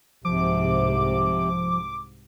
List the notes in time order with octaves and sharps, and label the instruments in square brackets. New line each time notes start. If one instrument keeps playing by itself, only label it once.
[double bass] C2 G#2 [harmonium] C3 [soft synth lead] F3 [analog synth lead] D6